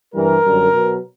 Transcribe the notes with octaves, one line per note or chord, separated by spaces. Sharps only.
G2 E3 G3 A#4
F#2 D3 G3
B2 F#3